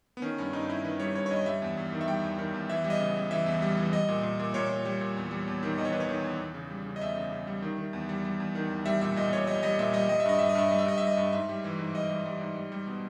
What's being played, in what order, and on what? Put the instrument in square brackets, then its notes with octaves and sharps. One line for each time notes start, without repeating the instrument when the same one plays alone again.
[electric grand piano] B3
D#3 C#4
G2 C#4
G2 D#4
G2 E4
D#3 B4
G3 C#5
G2 C#5
C#5
G2 D#5
G3 E5
E2
E2
D#3
E5
G3 G5
E2
D#3
E2
E3 E5
G3
D#5
C#3
G3
E3 E5
E2
G3
E3
G3 D#5
A#2
A#2
A#2
A#2 C#5
A#2
G3
A#2
E2
G3
E2
D#3
E2 D#5
C#5
D#3 B4
C#5
D#3
E2
E2
C#3
G3
C#3
D#5
E2 E5
C#3
C#3
G3
D#3
D#3
E2
G3
G3
E2
D#3
E2
G3 E5
A#2 E5
A#2 D#5
A#2 C#5
G3 D#5
G3 D#5
A#2 E5
G3 D#5
G3 D#5
E5
G2 D#5
G3 E5
D#5
G2 E5
G3 D#5
E5
G2 D#5
E5
G3 D#5
G2
G#2 E5
G3
E3
G#2
G3 D#5
G3
G3
G#2
G3
G3
B2